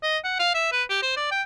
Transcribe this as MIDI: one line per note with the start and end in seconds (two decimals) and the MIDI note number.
0.03 0.18 75
0.24 0.37 78
0.39 0.51 77
0.54 0.71 76
0.72 0.83 71
0.89 0.98 67
1.02 1.12 72
1.16 1.27 74
1.31 1.42 79